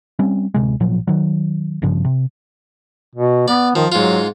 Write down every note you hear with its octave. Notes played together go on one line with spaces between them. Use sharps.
G3 C4 C#4
D1 C3 G#3
G#1 A#2 F3 F#3
D#3 F#3
A1 G2 C#3 F3
C3
B2
B3 D5
D#3 F3
G#2 F#3 F4